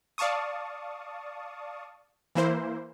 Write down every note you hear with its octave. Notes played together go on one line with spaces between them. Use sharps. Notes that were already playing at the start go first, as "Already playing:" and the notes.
D5 F5 A5 C#6 D#6
E3 A#3 E4 C5